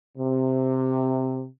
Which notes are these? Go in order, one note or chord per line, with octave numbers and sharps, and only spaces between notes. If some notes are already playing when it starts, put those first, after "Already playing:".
C3